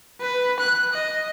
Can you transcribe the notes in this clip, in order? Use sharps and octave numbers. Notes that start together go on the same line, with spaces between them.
B4
F#6
D#5